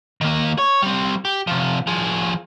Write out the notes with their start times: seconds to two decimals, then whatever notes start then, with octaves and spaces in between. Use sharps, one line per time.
0.21 D#3 A#3
0.58 C#5
0.82 G3 C4
1.25 G4
1.47 C3 F3
1.87 F3 G#4